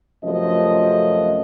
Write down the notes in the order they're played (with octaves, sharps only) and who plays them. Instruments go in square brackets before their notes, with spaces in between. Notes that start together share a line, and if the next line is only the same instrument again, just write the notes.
[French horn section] F#2 C3 F3 A3 D#5